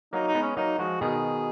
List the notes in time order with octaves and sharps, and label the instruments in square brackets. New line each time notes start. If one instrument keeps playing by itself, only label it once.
[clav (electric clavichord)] F#3 A#3 [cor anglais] D#4
[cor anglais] D#4
[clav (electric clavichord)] G#3 B3
[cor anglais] C#4
[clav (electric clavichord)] F#3 A#3 [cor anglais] D#4
[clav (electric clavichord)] F3 G#3 [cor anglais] F#4
[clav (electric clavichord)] B2 D#3 [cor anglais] G#4